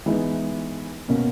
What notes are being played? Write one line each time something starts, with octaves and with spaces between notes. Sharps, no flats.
E3 G#3 B3 D#4
B2 A#3 C#4